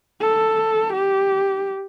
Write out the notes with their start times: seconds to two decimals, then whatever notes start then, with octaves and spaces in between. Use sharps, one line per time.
0.21 A4
0.93 G4